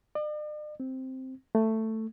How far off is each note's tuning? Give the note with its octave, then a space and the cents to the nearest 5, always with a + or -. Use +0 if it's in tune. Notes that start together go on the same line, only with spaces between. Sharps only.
D5 +45
C4 +0
A3 +10